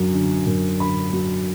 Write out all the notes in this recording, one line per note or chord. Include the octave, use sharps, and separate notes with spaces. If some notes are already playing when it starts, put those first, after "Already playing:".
Already playing: F#2 D3 F#3
D3
F#2
D3 B5
F#3